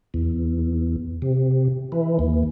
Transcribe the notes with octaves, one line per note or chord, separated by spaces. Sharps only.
E2
C3
E3
D#2